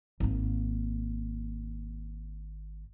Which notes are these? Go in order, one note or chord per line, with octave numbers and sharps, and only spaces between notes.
G#1 A#3